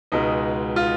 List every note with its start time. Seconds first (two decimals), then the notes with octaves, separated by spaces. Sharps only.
0.12 C#2 B2 G#3 D#4
0.76 F4